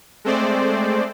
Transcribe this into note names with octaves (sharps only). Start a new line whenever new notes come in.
G#3 A3 C4 C5 D5